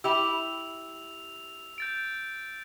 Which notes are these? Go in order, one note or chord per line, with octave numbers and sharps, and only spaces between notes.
E4 G4 E6 F7
G6 A6 D7